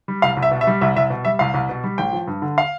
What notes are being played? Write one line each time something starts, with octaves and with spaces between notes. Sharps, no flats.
G3
C2 F5
C2
E5
B2
E5
G3
C2 E5
C2 E5
B2
G3 E5
C2 F5
C2
B2
G3
A1 G5
F3
G2
D3
F5